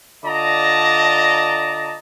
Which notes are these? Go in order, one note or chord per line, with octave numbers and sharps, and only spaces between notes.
D3 F4 D5 D#5 A5 A#5